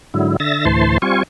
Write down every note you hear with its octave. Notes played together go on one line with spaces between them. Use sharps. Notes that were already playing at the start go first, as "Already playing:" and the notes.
G#2 D3 F#3 E4
D3 E5 A6 A#6
D2 A2 E3 C5 A5 C6
G3 C4 F4 G#5 C#6